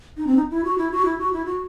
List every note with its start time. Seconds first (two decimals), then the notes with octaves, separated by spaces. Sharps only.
0.17 D#4
0.27 C4
0.37 D#4
0.51 E4
0.65 F#4
0.78 E4
0.92 F#4
1.05 E4
1.18 F#4
1.33 E4
1.46 F#4